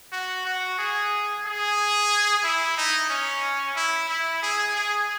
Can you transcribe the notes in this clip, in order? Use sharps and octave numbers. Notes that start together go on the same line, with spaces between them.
F#4
F#4
G#4
G#4
E4
D#4
C#4
E4
E4
G#4
G#4